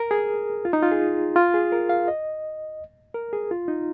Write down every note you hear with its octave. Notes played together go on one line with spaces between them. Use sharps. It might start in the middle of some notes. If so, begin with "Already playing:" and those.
Already playing: A#4
G#4
F4
D#4
F4
G#4
F4
G#4
A#4
F5
D#5
A#4
G#4
F4
D#4